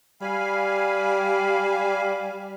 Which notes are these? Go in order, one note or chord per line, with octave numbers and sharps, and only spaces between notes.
G3 F5 G#5 B5